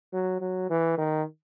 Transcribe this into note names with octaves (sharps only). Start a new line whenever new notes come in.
F#3
F#3
E3
D#3